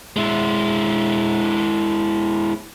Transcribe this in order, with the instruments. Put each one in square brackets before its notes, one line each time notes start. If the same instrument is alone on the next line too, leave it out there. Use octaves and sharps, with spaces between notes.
[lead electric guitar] G#3 E4